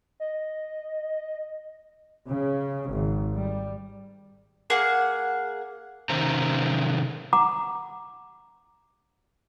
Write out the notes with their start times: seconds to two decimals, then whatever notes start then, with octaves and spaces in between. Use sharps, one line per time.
0.20 D#5
2.28 C#3
2.88 G#1
3.35 G3
4.70 A#3 G#4 F#5
6.09 C3 D#3 C#4 C5 A#5
7.33 F#5 A#5 D6